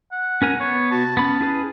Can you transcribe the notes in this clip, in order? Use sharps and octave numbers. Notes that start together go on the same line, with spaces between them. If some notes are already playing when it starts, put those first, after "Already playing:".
F#5
C#4 A#4 G#5
B3 C#5
C3 F#4 A5
B3 C#4 B5
E4 G#4 B4